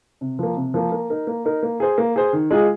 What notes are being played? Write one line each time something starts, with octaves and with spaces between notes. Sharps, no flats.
C3
F3 A#3
C3
F3 A#3
A#3
D#4 A#4
A#3
D#4 A#4
A#3
G#4 C5
A#3
G#4 C5
D#3
G#3 F4 G#4